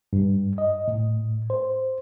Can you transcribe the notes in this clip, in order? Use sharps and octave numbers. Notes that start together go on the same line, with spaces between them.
G2
D#5
A2
C5